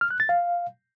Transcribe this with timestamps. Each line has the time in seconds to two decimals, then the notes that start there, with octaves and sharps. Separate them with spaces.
0.01 F6
0.10 F#6
0.20 A6
0.29 F5